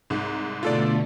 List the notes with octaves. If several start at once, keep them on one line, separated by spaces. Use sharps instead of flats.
C2 G#2
B2 D3 A3 F4 A4 D5